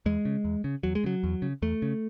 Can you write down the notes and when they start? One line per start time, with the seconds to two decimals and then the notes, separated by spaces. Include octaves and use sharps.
0.06 E2 G#3
0.25 C#3
0.45 E2
0.64 C#3
0.83 E2 F#3
0.95 G#3
1.04 C#3 F#3
1.23 E2
1.42 C#3
1.62 E2 A3
1.82 C#3